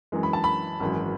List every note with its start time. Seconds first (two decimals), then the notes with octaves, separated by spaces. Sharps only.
0.12 F#2 E3 G#3
0.23 B5
0.33 A5
0.44 B5
0.80 G#1 F#2 E3 G#3